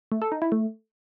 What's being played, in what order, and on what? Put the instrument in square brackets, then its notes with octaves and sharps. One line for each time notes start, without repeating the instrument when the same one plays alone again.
[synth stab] A3
A4
D#4
E4
A3